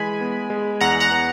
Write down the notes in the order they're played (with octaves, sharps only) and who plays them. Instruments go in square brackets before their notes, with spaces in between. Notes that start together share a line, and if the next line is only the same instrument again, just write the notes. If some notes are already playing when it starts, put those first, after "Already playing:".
Already playing: [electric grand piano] E3 G#3 [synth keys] G#5 B5
[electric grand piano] B3
G#3
[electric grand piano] E2 [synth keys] F#5 A#5
[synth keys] F#5 A#5
[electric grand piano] B3